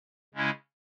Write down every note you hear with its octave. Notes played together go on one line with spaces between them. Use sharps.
C#3 G#3 C#4 E4